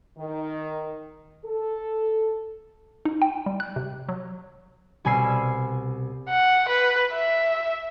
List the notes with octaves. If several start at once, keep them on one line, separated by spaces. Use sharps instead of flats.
D#3
A4
D#4
G5
G3
F#6
C3
F#3
C2 B2 G#5 B5 E6 C7
F#5
B4
E5